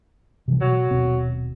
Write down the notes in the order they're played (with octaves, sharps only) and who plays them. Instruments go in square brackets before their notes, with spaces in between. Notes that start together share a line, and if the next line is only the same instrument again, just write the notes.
[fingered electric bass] C3 E3 G3
[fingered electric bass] B2 [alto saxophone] F#3
[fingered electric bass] D#1 B2 C4